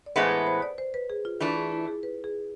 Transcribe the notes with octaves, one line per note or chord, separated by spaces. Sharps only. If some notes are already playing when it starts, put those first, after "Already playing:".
D5
A2 E3 G#3 B3 C5
B4
C5
D5
C5
B4
G#4
F4
E3 A3 D4 F4
G#4
E4
G#4
B4
G#4